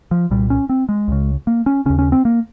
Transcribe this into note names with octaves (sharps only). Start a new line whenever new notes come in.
F3
C2 A#2 G3
C#4
C4
G#3
C#2 C#3
A#3
C#4
D#2 C#3 C#4
C#4
C4
A#3